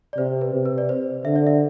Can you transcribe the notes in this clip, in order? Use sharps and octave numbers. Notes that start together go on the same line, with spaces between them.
D5
C3 C5
B4
C3
B4
D5
C5
D3 E5
D5
E5